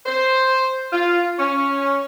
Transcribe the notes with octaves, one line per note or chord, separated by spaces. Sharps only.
C5
F4
C#4